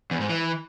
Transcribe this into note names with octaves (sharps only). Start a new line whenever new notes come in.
E2
G#2
E3